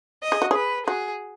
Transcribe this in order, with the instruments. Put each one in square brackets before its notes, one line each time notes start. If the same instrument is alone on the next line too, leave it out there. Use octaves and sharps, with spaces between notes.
[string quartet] D#5
[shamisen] G#4
F#4
[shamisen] G#4 [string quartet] B4
[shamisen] F#4 [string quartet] G#4